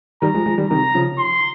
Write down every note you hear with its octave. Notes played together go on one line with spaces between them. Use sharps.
D#3 G3 A#5
F3 G#3
F3 G#3
D#3 G3
C3 D#3 A#5
C#3 F3
C6